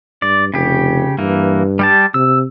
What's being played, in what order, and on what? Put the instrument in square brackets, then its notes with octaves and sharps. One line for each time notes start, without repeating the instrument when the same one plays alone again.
[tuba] G2 [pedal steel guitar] D5
[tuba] F1 [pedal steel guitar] C#3 G4
[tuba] G2 [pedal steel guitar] E3 A#3
[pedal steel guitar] G3 G4 A5
[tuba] C3 [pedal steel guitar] E6